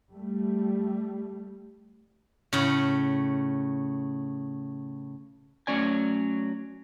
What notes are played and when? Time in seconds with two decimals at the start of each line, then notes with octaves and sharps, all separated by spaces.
0.13 G3 A3
2.53 A2 C#3
5.67 F#3 A3 C#4 D5 G#5